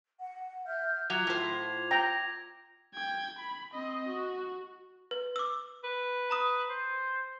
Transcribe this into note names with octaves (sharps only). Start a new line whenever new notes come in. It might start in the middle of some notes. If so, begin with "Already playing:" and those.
F#5
E5 F6 G6
F#3 F4 D6 G#6 F7
A2 C5
G5 A#5 A#6
G5 G#6
B5
C4 D#5
F#4
B4
D6 E6
B4
A#5 B5 D#6
C5